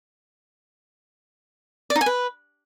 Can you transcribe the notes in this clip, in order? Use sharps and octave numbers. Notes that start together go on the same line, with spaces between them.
D5
D#4
G#5
B4